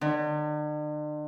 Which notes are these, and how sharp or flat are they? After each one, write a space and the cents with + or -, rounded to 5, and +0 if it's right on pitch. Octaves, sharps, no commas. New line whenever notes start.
D3 +45